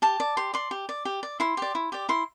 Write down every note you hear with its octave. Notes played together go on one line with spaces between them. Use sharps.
G4 A5
D5
G4 C6
D5 C6
G4
D5
G4
D5
E4 C6
G4 D5
E4
G4 D5
E4 C6